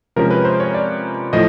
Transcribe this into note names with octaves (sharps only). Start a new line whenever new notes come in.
C3 F3 G#3 C#4 A#4
B4
C5
C#5
D5
A2 F3 A3 D#5